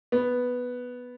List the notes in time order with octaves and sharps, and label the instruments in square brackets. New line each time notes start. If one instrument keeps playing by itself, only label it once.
[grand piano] B3